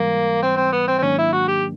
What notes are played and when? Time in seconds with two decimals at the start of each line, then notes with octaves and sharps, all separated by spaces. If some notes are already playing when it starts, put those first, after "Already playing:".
Already playing: G#2 E3 G3 A#3
0.43 C4
0.57 C4
0.73 B3
0.88 C4
0.98 C4
1.02 G#2 D#3 F#3 A#3 C#4 D4
1.19 E4
1.33 F#4
1.48 G4